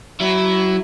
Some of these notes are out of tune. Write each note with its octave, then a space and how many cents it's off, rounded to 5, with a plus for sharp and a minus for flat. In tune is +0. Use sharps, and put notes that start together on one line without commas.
F#3 +25 E4 +0